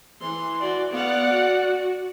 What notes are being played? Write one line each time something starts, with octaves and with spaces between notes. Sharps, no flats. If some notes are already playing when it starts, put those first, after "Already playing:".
E3 C6
F#4 D5
B3 D5 F5 F#5
F#4